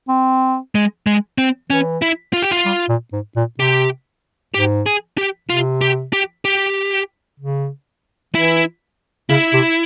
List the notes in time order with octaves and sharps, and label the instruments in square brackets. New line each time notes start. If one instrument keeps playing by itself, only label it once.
[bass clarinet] C4
[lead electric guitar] G#3
G#3
C4
[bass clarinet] E3 [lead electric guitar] C#4
[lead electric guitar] E4
F4
G4
F4
[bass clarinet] G3
A#2
G#2
A#2
[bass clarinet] C3 [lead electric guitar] G4
[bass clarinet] G#2 [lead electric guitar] G4
[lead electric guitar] G#4
G4
[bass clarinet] C3 [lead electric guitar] F4
[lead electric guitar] G4
G4
G4
[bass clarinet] C#3
[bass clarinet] E3 [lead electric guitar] E4
[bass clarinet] C#3 [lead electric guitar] E4
[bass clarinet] C3